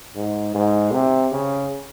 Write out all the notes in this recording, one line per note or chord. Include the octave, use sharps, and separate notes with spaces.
G#2
G#2
C3
C#3